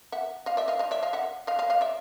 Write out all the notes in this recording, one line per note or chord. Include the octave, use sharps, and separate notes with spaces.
E5 F#5
D#5 F5
D5 E5
D#5 F5
D#5 F5
D5 E5
D#5 F5
E5 F#5
D#5 F5
D#5 F5
D#5 F5
D5 E5